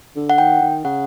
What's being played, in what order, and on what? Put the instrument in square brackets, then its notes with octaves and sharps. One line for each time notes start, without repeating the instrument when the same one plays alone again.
[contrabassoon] D3
[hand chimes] F#5
[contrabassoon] D#3 [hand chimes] G5
[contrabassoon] D#3
[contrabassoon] C#3 [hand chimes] F#5